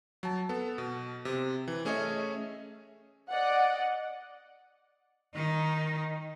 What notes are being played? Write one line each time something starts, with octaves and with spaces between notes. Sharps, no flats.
F#3 A5
B3 A4
B2
C3
E3
A3 C#4 G#4 C#5 D#5 E5
D5 D#5 F#5
D#3 D#4